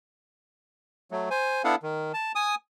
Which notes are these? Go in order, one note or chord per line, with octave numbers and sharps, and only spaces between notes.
F#3 A3
C5 G#5
B3 D4 E4 A4 F5 F#5
D#3
A5
G#5 D#6